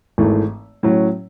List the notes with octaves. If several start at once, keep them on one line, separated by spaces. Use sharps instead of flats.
G#1 G#2 E3 A3
A2 F#3 C#4